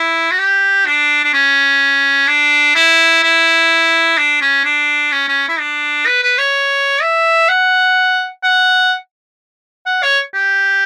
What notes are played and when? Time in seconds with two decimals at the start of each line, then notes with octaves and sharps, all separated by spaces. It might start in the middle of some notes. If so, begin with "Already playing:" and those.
Already playing: E4
0.31 F#4
0.38 G4
0.86 D4
1.24 D4
1.33 C#4
2.28 D4
2.75 E4
3.23 E4
4.18 D4
4.41 C#4
4.65 D4
5.12 C#4
5.28 C#4
5.49 E4
5.60 D4
6.07 B4
6.23 B4
6.38 C#5
7.02 E5
7.49 F#5
8.44 F#5
9.87 F#5
10.03 C#5
10.34 G4